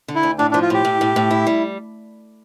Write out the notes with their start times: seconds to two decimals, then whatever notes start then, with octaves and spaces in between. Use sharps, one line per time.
0.08 D3
0.15 E4
0.23 D2
0.39 A2 D4
0.51 F3 D4
0.62 F4
0.70 A2 G4
0.85 A2
1.01 A2
1.16 A2
1.31 E4
1.47 G3